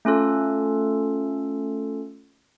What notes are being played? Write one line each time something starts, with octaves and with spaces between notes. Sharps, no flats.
A3 C#4 F4 A4